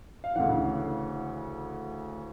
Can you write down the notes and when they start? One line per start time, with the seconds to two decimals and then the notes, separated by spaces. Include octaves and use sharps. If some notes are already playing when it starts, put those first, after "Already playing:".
0.24 F5
0.36 D2 C#3 E3 F#5